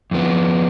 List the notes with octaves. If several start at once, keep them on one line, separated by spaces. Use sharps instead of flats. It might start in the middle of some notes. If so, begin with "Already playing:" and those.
F2 F3 B3